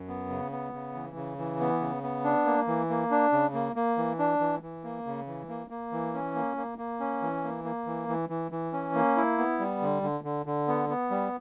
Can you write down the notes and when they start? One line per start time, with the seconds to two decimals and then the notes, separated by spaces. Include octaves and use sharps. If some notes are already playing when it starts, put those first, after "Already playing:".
Already playing: F#2
0.08 B3
0.30 C#3
0.52 B3
0.73 C#3
0.95 E3
1.16 C#3
1.38 E3
1.60 B3
1.81 C#3
2.03 B3
2.24 D4
2.46 A#3
2.67 E3
2.90 A#3
3.11 D4
3.33 C#3
3.54 A#3
3.76 A#3
3.97 E3
4.19 D4
4.40 E3
4.63 E3
4.84 A#3
5.06 C#3
5.27 E3
5.49 A#3
5.70 A#3
5.92 E3
6.14 C#4
6.35 A#3
6.57 A#3
6.78 A#3
7.00 C#4
7.22 E3
7.44 A#3
7.65 A#3
7.86 E3
8.08 E3
8.29 E3
8.52 E3
8.73 C#4
8.95 A#3
9.17 E4
9.38 B3
9.59 G3
9.81 D3
10.03 D3
10.24 D3
10.46 D3
10.68 B3
10.89 B3
11.11 G3